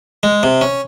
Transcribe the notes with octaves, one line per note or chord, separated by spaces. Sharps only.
G#3
C3
C#4